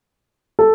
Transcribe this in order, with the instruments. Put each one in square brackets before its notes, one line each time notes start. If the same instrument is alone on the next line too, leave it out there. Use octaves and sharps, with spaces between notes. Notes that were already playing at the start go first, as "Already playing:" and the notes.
[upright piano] A4